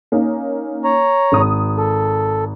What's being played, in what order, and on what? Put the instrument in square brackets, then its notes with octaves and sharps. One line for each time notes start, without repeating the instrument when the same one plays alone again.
[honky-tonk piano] A#3 C#4 D#4
[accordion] C#5 A#5
[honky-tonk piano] G#1 D#6
[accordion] A4